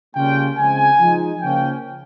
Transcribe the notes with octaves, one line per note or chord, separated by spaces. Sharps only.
C#3 G3 A#3 C#4 F4 G5
C#3 F3 G#3 C4 G#5
F3 G#3 D#4
C#3 F3 A#3 C#4 G5